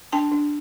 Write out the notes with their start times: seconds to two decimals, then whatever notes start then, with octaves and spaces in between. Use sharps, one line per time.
0.12 D4 G5 A5
0.31 D4